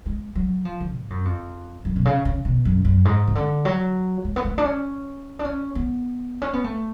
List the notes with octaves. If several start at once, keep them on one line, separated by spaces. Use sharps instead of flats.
G#3
F#3
F3
D3
G#2
F#2
F2
F#2
B2
C#3
C#3
B2
F#2
F#2
G#2
C#3
D3
F#3
G#3
B3
A3
D4
C#4
D4
C#4
B3
C#4
B3
A3